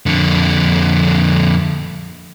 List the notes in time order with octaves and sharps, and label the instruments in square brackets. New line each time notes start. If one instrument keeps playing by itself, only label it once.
[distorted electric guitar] F2 D3